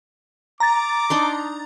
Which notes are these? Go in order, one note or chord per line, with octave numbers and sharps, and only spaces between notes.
A#5 D6 A6
D4 D#4 C6